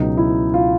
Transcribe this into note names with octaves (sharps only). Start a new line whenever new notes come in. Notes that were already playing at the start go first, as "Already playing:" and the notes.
Already playing: C#2 B2 F#3 B3 D#4
E4
F4